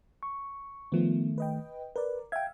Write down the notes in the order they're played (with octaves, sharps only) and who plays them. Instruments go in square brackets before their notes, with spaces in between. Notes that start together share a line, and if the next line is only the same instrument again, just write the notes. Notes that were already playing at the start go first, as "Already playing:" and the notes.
[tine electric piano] C#6
[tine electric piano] D#3 A3 [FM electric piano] F3 B3
[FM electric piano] B4 D#5 G5
[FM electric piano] A#4 D5 [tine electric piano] B4
[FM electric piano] E5 F5 [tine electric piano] G5 G#6